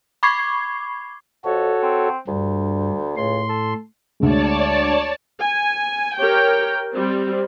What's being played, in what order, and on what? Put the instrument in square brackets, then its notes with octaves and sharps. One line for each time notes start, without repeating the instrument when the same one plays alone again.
[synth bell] B5 C#6 D6 G#6 C7
[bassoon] F2 [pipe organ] F#4 A4 C#5
[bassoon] C4
[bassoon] D2 [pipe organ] G2
[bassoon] C#2 [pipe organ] A2 C6
[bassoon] A4
[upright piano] D2 G#3 [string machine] C#5 D5 A5
[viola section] G#5
G4 A#4 C#5 G5
G3 C4